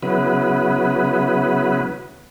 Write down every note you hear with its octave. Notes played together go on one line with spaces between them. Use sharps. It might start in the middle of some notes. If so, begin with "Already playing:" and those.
C#3 F#3 B3 E4 B4